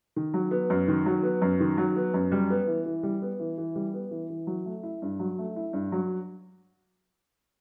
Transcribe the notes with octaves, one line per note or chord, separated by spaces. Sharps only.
D#3
F#3
B3
F#2
D#3
F#3
B3
F#2
D#3
F#3
B3
F#2
G3
B3
E3
E3
G3
B3
E3
E3
G3
B3
E3
E3
F#3
A3
E4
G2
F#3
A3
E4
G2
F#3